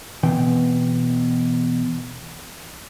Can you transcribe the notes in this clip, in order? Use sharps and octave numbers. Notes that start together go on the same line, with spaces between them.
B2 E3 C4 G5